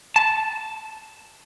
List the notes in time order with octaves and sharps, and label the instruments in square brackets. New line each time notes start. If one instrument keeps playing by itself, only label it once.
[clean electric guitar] A5